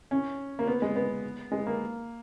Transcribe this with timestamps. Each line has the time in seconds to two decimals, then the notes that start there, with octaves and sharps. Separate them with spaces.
0.11 C#4
0.59 A#3
0.68 B3
0.82 G#3
0.96 B3
1.52 G#3
1.67 A#3